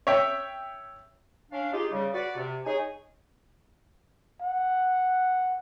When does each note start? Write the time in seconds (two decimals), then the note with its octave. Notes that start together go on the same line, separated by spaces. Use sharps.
0.07 C#5 E5 G5
1.51 C#4 D4 F5
1.72 D#4 F4 G4 G#4
1.92 C#3 G3
2.12 F#4 B4 D5
2.36 C3
2.65 D#4 G#4 C#5 G#5
4.41 F#5